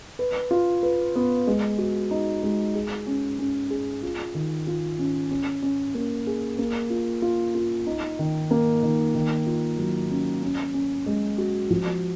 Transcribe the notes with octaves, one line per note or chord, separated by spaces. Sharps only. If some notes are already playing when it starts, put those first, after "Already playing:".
B4
F4
B4
B3
G#3
F#4
D#4
G#3
G#4
C#4
C#4
G#4
F4
D#3
F4
C#4
C#4
C#4
A#3
G#4
A#3
F4
F4
F4
D#4
D#3
A#3
D#3
D#3
F4
F#3
C#4
C#4
C#4
G#3
F#4
F3